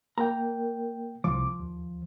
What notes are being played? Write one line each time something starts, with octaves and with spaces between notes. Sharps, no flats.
A#3 A#4 G5 A#5
C2 F3 D6
D#2